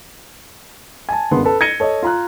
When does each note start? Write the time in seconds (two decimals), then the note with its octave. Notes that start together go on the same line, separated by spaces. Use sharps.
1.09 G#5 A5
1.31 F#1 G2 B3 C6
1.44 A4 B4
1.61 G#6 A#6 C#7 D#7 G7
1.80 A4 C#5 D#5
2.03 F4 A#5 F#6